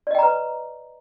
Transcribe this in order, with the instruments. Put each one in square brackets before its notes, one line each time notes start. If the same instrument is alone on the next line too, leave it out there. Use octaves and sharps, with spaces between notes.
[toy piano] D5
D#5
G5
A#5
B4